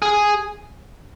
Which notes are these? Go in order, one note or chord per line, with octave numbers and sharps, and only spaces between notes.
G#4